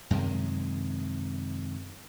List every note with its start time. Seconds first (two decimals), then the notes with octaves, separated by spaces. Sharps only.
0.10 F#2 C3 D#3 G#3